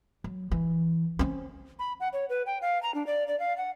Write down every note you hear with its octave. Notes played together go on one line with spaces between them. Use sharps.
F#3
E3
C4 C#4
B5
F#5
C#5
B4
G5
F5
A#5
D4
D5
D5
F5
F#5